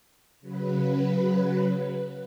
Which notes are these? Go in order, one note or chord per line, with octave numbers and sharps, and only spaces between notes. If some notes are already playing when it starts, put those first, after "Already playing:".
C#3 F#3 B4